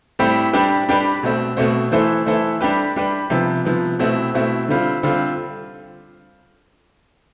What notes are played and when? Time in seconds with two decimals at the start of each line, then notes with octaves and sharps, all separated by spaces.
0.19 A2 G3 C4 G4
0.53 G3 D4 G4 B4
0.89 G3 D4 G4 B4
1.23 B2 A3 C4
1.57 B2 A3 C4
1.92 E3 A3 E4 A4 C5
2.26 E3 A3 E4 A4 C5
2.61 G3 D4 G4 B4
2.96 G3 D4 G4 B4
3.30 C3 F3 B3
3.65 C3 F3 B3
3.99 B2 A3 C4 E4
4.34 B2 A3 C4 E4
4.68 D3 G3 C4 F4
5.03 D3 G3 C4 F4